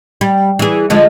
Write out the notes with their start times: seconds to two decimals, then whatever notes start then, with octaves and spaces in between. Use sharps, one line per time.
0.21 G3
0.59 E3 G#4
0.90 D3 F3 G#3